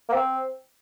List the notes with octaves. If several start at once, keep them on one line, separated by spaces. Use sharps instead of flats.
A#3
C4